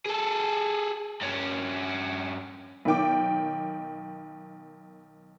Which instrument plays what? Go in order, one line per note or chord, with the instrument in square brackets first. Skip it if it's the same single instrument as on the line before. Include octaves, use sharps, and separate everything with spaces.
[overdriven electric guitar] G#4 A4
G2 C#4
[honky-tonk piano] B1 D#3 G5 D6